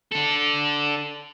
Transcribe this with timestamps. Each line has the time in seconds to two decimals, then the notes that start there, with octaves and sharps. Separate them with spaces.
0.12 D4 A4